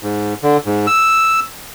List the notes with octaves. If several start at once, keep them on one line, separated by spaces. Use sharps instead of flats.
G#2
D3
G#2
E6